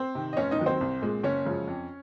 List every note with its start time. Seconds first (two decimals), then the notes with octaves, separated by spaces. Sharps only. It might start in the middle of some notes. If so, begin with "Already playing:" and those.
Already playing: C4 C5
0.15 C3 D#3
0.33 D#5
0.37 F1 C#4 C#5
0.51 D#4 D#5
0.59 D#2 D#3 F#3
0.66 C4 C5
0.81 C2
1.02 A#2 G#3
1.24 F#1 C#4 C#5
1.45 F#2 C#3 F3 G#3
1.67 F2